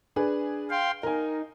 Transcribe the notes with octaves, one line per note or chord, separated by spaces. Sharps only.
D4 G#4 B4
F5 G5 C6
D#4 A#4 G#5